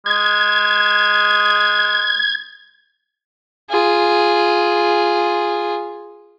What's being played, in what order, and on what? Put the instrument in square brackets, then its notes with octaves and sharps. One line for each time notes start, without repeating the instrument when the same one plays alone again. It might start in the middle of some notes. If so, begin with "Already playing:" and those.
[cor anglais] G#3 [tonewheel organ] G#6
[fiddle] F4 G#4